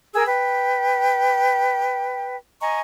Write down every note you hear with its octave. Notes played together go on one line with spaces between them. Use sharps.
G#4 A#4 G#5 E6
B4 G5
D#5 G#5 A#5 C#6